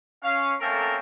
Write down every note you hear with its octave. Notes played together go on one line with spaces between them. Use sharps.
C#4 F5
A3 A#3 C4 C#4 A4 A#4